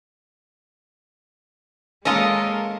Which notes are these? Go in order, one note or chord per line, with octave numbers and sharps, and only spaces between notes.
G#3 A#3 C#4 F4 A4 A#4 D#5